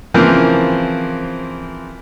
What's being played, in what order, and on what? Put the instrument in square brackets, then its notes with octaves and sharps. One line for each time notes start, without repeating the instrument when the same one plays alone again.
[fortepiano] C#3 E3 F3 A#3 C4 A#4